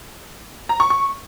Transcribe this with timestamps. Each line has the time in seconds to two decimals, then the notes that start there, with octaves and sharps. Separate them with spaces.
0.69 A#5
0.80 C#6
0.90 C#6